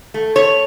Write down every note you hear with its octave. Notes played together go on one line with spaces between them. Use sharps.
A3
A3 C#5